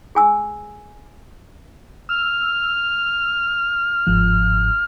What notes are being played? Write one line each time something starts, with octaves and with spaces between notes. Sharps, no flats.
G#4 G#5 E6
E6 F6
G1 G#2 F3